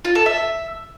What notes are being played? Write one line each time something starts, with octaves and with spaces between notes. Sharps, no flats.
F4
A4
E5